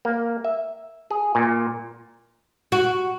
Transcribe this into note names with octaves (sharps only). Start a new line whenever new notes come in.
A#3
E5
G#4
A#2
F#4